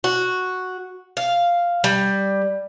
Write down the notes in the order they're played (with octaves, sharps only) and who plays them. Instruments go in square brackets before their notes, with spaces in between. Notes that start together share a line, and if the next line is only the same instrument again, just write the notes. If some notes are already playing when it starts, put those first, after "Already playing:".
[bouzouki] F#4
F5
G3